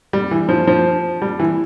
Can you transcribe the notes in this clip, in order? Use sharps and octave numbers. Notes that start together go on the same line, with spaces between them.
G3
E3
F3
F3
G3
E3